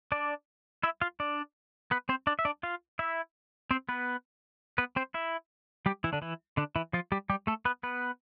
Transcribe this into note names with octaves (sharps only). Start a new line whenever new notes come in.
D4 D5
E4 E5
F4 F5
D4 D5
B3 B4
C4 C5
D4 D5
E5
D4 D5
F4 F5
E4 E5
C4 C5
B3 B4
B3 B4
C4 C5
E4 E5
G3 G4
E3 E4
D3 D4
E3 E4
D3 D4
E3 E4
F3 F4
G3 G4
G3 G4
A3 A4
B3 B4
B3 B4